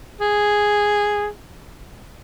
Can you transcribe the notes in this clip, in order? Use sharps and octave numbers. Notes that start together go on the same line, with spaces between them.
G#4